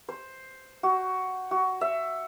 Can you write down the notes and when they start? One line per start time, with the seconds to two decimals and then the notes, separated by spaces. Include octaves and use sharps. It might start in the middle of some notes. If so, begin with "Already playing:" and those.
0.09 C5
0.83 F#4
1.51 F#4
1.81 E5